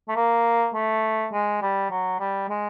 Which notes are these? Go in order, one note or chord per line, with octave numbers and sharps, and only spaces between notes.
A3
A#3
A3
G#3
G3
F#3
G3
G#3